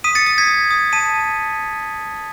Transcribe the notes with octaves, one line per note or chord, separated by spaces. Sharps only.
D#6 B6 D#7
A6 C#7
D#6 A6
G#6 B6
D#6
D#6
A5 B6 D#7